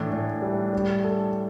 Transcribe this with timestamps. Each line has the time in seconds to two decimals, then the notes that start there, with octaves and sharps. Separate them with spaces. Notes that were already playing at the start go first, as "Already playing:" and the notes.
Already playing: A2 E3 D4
0.11 A2
0.42 G3
0.73 G3
1.04 A4